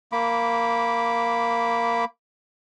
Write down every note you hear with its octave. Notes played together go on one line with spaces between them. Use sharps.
A#3 B5 D6